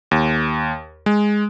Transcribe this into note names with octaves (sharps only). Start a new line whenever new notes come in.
D#2
G#3